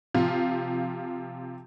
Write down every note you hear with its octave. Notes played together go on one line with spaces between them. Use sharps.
C3 F3 F4